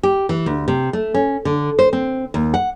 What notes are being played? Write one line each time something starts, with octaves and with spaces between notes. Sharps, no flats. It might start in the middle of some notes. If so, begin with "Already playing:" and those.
G4
E3
D2
C3
A3
C#4
D3
C5
C4
D#2
F#5